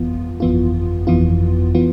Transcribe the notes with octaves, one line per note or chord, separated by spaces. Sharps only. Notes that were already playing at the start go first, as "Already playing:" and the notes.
Already playing: G1 F2 E3 B3 F4
G1 F2 E3 B3 F4
G1 F2 E3 B3 F4
E3 B3 F4